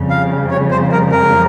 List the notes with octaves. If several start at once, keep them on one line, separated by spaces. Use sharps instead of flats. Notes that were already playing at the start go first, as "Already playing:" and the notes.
Already playing: F2 C#3 G3
F5
C#5
C5
A#4
A#4